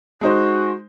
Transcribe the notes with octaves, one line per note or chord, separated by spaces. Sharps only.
G#3 D#4 F#4 C5